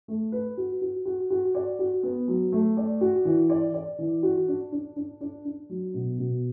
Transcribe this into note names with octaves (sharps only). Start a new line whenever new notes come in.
A3
B4
F#4
F#4
F#4
F#4
D5
F#4
B3
F#3
A3
D5
F#4
E3
D5
D5
E3
F#4
D4
D4
D4
D4
D4
F#3
B2
B2